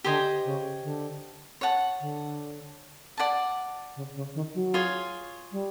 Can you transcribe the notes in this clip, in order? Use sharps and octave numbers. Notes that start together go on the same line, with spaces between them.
D3 G4 C5 D#5 G#5
C#3
D3
C#5 F#5 A5
D3
D5 F#5 A5
C#3
C#3
D#3
F#3
F4 G#4 C#5
G3